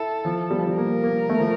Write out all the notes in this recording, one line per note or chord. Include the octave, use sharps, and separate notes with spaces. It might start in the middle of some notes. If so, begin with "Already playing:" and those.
Already playing: E4 A4
F3
G3
F3
G3
A#3 A#4
A#3
A3
F3